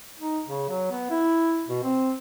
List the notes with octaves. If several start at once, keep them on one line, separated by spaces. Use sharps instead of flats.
D#4
C#3
F#3
B3
E4
B2
C4